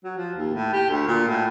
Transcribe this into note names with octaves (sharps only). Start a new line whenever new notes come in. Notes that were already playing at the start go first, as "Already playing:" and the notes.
F#3
F3
D#2
A2
G4
D2
A#2
A2